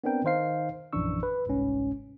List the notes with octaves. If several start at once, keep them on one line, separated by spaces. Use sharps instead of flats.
B3 C4 D4 A#4 G5
D#3 D#4 C5 F5 C7
A#1 F#2 E3 D4 C#6 E6
B4
G1 C2 G#2 C#4